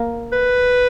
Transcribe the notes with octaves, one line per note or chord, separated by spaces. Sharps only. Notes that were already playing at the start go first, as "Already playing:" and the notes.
Already playing: A#3
B4